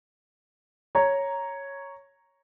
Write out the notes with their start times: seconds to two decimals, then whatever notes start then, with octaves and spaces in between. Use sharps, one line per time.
0.95 C#5 A#5